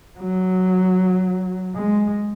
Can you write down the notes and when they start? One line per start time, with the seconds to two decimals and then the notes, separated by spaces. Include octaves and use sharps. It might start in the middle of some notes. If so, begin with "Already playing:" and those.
0.20 F#3
1.76 G#3